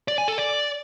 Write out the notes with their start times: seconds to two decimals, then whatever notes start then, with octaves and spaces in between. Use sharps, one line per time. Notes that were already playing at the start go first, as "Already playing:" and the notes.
0.08 D5
0.18 G#5
0.28 A4
0.38 D5